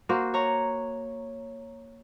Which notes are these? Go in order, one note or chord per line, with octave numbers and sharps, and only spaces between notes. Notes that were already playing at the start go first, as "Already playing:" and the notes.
A#3 F#4 C5
C#5 A#5